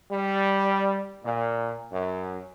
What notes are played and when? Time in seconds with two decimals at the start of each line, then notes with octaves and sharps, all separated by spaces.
0.11 G3
1.24 A#2
1.92 F#2